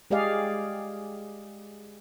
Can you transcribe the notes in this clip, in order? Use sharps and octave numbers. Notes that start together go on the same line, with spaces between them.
G#3 G4 G#4 D5 D#5 F5